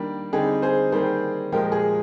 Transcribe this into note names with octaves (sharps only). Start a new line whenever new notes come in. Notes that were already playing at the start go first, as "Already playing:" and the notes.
Already playing: D#3 G3 A#3 D4
D3 G3 C4 D#4 G#4
G#4 C5
D#3 G3 A#3 G#4 C5
A#2 F3 G#3 G4 A#4
G#4